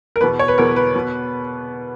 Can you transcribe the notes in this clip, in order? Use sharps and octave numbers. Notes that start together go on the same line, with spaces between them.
A#4
E2 B2 B4
C#5
B4
E2 B2 A#4
B4
B2